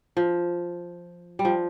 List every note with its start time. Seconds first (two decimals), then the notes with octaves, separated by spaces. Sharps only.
0.17 F3
1.39 G3
1.45 F3